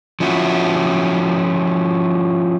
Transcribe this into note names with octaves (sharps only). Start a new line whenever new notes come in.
F3 C#4 E4 F#4